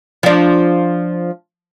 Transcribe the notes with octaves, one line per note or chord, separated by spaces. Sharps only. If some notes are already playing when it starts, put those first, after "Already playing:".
F3 D4